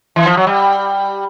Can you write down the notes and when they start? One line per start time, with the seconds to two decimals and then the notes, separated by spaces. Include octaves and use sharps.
0.16 E3
0.26 F3
0.37 F#3
0.47 G3